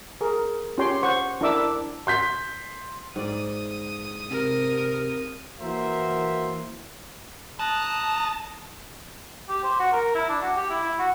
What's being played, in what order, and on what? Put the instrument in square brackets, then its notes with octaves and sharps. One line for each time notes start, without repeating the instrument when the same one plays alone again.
[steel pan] G#4 A#4
C#4 F4 G4 C#5 G5 C6
C5 F#5 C#6
D4 E4 A#4 E5 D6 E6
[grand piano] C6 G6 B6
[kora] G#2 D5 [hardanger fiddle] D#6
[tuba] C3 [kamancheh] A#4
[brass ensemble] E3 A#3 F#4 A#4 C5 E5
[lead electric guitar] A5 [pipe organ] A#5 D#6 F#6
[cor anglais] G4
C5
F#4
A#4
E4
D4
F#4
G4
E4
E4
F#4